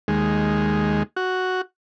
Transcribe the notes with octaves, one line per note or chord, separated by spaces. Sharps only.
D#2 G#3
F#4